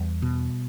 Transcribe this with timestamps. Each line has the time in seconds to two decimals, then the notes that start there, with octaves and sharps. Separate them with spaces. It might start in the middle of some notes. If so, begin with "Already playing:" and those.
Already playing: E2 G3
0.22 B2